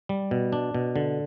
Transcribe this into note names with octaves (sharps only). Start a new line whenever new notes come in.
G3
B2
D4
B2
D3